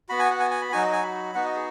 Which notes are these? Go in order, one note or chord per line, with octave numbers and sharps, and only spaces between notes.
B3 F#4 B5
G#5
F#5
G#5
G#5
B5
F#3 D#4 F#4 G#5
D#5
G#5
B5
B3 D#4 F#4 F#5
D#5
G#4